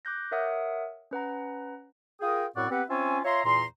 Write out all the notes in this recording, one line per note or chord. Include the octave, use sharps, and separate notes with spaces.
D6 F#6 G6 A#6
A#4 C#5 E5 F#5 D#6
C#4 B4 F#5 A#5
F4 G#4 A#4 G5 D#6
F#2 A2 C4 D5 F#5 C#6
B3 C4 G4 B4 F#5
C4 C#4 F4 C#5 E5 G#5
F4 C#5 E5 A#5 C6
E2 A#2 A#5 C6